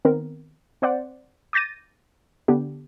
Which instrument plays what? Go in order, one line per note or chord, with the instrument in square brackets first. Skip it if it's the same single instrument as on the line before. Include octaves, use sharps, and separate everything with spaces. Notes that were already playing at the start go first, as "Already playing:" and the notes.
[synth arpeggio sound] D#3 B3 C4 A#4
C4 C5 D5 F#5
D6 G6 A6 A#6 D#7
D3 B3 D4 G4